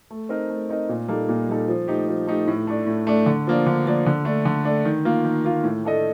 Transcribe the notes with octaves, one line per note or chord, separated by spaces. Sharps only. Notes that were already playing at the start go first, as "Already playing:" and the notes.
A3
C4 D#4 A#4 D#5
A3
C4 D#4 A#4 D#5
A#2
G3 A#3 D#4 A4
A#2
G3 A#3 D#4 A4
F3
A3 D#4 G4
F3
A3 D#4 G4
A2
A3 D4
A2
A3 D4
D3
F3 A#3 D4
D3
F3 A#3 D4
D3
A3 D4
D3
A3 D4
D#3
A#3 F4
D#3
A#3 F4
A2
A3 D4 A4 D#5